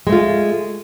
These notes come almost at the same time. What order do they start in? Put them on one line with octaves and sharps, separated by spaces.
G#3 A3 F4